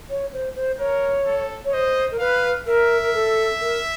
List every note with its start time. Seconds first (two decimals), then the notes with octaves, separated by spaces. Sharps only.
0.10 C#5
0.33 C5
0.56 C5
0.79 A#4 C#5
1.26 A4
1.65 C#5
1.72 C5 D#5
2.12 A#4
2.19 B4 F5
2.66 A#4 E5
3.02 A#4
3.14 A4
3.61 A#4